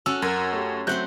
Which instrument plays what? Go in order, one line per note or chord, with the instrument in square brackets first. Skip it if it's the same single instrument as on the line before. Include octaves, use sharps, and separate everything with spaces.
[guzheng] C#4 F#4 A4 [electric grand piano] E6
[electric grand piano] F#2 [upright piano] A#4 [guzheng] G#5
[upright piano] A3 G4
[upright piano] F#3 C4 [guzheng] A3 F#5 C6 [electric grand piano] F#6 G6